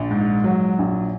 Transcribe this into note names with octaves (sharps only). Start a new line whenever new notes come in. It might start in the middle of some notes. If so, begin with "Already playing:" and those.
Already playing: A#1
G#2
F#3
A#1